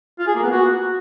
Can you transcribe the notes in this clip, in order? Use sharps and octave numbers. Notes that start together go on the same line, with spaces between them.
F4
G#4
A#3
B3
F#4